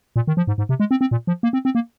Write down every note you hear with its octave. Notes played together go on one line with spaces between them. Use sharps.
A#2
D#3
F3
G#2
G#2
C3
G#3
C4
C4
A#2
F3
A#3
C4
C4
A#3